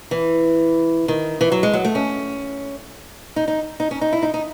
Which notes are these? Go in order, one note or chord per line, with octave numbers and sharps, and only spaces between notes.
E3
D#3
E3
F#3
G#3
F#3
A3
C#4
D#4
D#4
D#4
C#4
D#4
E4
D#4
D#4